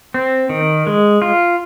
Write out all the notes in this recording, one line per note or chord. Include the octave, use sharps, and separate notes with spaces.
C4
D#3
G#3
F4